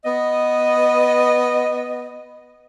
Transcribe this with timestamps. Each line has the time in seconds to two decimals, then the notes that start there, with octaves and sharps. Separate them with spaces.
0.05 B3 D#5